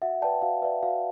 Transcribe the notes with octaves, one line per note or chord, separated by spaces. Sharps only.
F#4 E5 F#5
B4 D5 G5 A5
F#4 F5
B4 D5 E5
F#4 F5